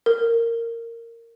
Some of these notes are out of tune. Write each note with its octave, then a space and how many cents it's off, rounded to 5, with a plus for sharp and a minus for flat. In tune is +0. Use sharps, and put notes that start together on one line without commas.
A#4 -15